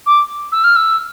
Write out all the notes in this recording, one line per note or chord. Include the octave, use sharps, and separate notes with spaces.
D6
E6
F6
E6